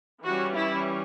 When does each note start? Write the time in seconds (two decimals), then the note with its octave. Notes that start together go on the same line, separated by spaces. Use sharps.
0.23 E3 G3 C#4 F#4
0.55 E4